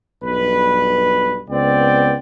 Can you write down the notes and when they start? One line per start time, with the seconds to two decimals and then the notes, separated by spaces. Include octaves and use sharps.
0.23 B1 G2 B4
1.49 C#2 B3 C4 D5 G5